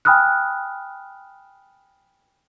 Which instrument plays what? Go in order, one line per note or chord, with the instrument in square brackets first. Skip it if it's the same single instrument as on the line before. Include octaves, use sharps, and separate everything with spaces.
[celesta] G5 G#5 B5 D#6 F6 F#6